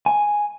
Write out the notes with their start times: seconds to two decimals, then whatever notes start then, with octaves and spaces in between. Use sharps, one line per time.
0.06 G#5